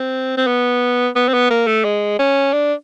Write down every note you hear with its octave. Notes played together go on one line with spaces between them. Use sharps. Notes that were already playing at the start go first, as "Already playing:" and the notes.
Already playing: C4
C4
B3
B3
C4
B3
A#3
A3
G#3
C#4
D4